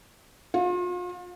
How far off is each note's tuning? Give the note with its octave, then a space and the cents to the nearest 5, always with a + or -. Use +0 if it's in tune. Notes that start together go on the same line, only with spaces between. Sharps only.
F4 +40